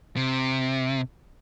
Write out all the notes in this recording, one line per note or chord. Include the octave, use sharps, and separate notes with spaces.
C3